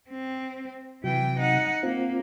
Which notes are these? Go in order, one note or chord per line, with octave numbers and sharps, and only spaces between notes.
C4
C3 E3 F#3 G5
D#4 F#5
A#3 C4 F4